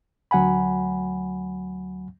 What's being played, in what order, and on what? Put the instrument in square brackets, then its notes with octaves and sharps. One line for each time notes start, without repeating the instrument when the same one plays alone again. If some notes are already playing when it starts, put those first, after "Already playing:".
[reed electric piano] D2 F#3 F#5 G#5 B5